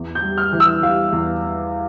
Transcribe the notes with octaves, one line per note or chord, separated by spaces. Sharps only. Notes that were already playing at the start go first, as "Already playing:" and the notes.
Already playing: E2
G6
G3
F6
E3
E6
G3 F5
E2